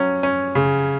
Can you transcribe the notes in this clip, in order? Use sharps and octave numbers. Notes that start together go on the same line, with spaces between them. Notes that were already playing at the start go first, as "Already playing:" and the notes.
Already playing: F#3 C#4
C#4
C#3